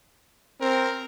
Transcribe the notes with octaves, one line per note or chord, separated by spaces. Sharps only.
C4 A#4